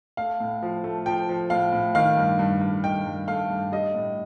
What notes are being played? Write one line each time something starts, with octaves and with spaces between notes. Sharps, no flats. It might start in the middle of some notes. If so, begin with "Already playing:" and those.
A3 F5
A2
F3
A3
F3 G5
F3
A2 F5
A2
D#3 F5
G2
G2
G2
D#3 G5
G2
A3 F5
G2
G3 D#5
A2